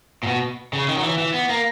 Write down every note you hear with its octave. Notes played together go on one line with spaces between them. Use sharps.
A#2
B2
C#3
D#3
F#3
E3
E3
B3
A#3